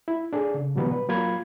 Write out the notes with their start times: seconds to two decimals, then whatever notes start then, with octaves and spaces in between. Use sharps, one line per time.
0.08 E4
0.33 D4 G#4 A4
0.54 C#3
0.76 B2 D3 E3 F#3 G3 B3
0.91 B4
1.09 F#3 A#3 F4 B5 G#6